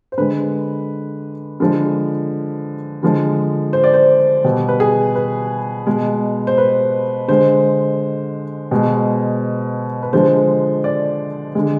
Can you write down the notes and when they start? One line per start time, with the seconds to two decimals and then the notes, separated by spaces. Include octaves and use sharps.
0.12 C5
0.18 D3 G#3 B4
1.60 D3 F3 G#3
3.03 D3 F3 G#3
3.73 C5
3.84 D5
3.94 C5
4.44 B2 G3
4.68 B4
4.80 G#4
5.15 B4
5.87 B2 G#3
6.47 C5
6.58 B4
7.28 D3 G#3 C5
8.71 B2 G#3
10.03 B4
10.13 D3 F3 G#3 C5
10.84 D5
11.55 D3 G#3